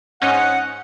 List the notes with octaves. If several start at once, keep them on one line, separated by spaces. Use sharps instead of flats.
G#2 C#4 D#4 F#5